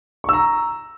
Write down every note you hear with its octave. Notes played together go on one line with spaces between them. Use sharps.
A#5 C#6 E6